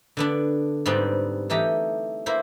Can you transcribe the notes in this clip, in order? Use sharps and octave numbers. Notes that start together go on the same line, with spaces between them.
D3 B3 D4
G#2 G3 B3 C4 D4
E3 A3 D#4 G4 A#5
A#3 E4 C5